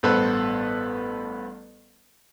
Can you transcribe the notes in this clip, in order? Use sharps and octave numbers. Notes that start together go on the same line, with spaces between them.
A1 G2 B3 A4 B4 C5